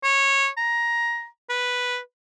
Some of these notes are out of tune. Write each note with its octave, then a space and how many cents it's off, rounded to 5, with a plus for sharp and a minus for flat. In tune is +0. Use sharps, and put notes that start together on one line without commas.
C#5 -15
A#5 +15
B4 -5